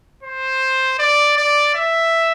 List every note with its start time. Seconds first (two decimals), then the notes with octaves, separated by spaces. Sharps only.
0.23 C5
0.99 D5
1.37 D5
1.75 E5